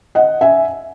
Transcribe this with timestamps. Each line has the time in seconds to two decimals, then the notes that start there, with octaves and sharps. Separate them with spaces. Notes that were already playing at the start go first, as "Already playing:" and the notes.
0.15 D#5 F#5
0.41 E5 G#5